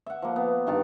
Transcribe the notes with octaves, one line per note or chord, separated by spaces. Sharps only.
E5 F#5
F3 A#3
B3
G2 D#3 F5 A5